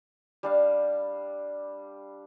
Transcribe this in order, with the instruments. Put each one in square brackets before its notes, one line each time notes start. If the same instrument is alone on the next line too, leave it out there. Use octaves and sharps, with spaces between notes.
[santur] G3 D4 F5